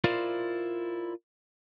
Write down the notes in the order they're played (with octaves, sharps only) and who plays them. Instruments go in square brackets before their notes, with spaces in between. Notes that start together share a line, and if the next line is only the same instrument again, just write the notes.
[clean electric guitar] E4 F4 A#4 C5 D5 F5